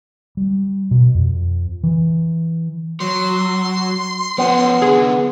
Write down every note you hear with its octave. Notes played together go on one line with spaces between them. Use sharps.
G3
B2
F2
E3
F#3 C6
F3 B3 C#4
D3 E3 G#4